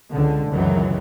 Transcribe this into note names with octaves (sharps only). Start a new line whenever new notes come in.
C#2 D3
C#2 F#2 D#3 E3 F#3